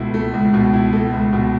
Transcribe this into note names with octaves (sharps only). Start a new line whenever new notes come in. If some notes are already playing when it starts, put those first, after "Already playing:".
Already playing: C#2 B2 A3 E4
A3
C#2
B2
E4
A3
C#2
B2